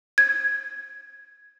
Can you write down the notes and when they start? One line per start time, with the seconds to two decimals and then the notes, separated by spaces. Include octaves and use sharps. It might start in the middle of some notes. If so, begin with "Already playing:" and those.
0.18 G#6